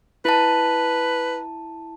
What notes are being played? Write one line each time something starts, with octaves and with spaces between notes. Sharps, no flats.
E4 B4 A5